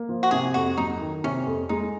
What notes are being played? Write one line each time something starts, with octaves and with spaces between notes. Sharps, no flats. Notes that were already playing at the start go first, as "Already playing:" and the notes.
Already playing: A#3
F3
F#4
C3 G#4
F2 F#4
F#3 D#4
D#3
C3 C#4
F2
G#3 D#4